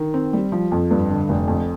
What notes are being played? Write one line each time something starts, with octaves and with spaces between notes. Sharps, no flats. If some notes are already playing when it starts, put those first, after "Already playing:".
Already playing: D#3
C4
G3
F3
F2
G2
D3
F1
F2